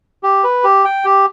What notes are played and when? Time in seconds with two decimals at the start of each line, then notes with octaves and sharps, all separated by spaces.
0.23 G4
0.44 B4
0.64 G4
0.85 G5
1.05 G4